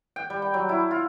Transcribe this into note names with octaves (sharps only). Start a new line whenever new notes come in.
G5
G3
G5
F#3
E4
F4